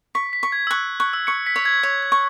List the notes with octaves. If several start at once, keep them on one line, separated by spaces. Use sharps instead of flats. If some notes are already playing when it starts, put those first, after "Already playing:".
C#6 B6
B6
C#6
G#6
E6
C#6 F#6
C#6 F#6
E6
C#6 C#7
B6
C#5
G#6
C#5 G#6
G#6
C#6